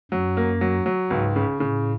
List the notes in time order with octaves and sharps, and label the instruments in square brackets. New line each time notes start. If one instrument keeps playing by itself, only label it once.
[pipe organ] F#2 [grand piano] F#3
[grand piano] A#3
F#3
F#3
[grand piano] C#2 [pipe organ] G#2
[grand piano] C#3
[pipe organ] A2 [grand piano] C#3